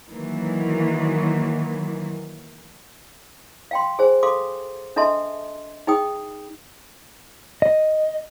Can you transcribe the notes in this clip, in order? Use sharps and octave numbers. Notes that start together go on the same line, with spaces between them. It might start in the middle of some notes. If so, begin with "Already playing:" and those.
D#3 E3 F#3 A#3
F5 G5 C6
G#4 C5 G#5
A4 F5 C6 D6
D4 A4 D#5 E5 A5 C6
D#4 G#4 G5 D#6
D#5